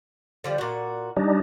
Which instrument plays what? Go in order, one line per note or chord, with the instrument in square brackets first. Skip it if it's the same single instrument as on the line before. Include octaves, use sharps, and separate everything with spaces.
[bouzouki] D3 F3 G3
A#2 F#4
[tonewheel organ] G3 D4 D#4